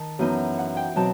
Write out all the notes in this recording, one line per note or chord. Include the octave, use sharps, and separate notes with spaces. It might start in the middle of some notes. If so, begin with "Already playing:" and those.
Already playing: D#3 A5
F#2 E3 B3 D#4
F#5
G5
B2 F#3 C4 A5